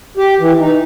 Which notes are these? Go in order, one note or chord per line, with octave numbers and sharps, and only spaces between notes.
G4
E3
D#4